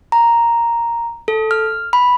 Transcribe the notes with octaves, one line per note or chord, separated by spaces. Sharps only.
A#5
A4
F6
B5